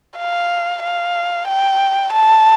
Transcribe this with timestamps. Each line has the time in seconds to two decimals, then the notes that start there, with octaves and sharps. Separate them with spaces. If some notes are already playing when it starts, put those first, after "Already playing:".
0.18 F5
0.83 F5
1.48 G5
2.13 A5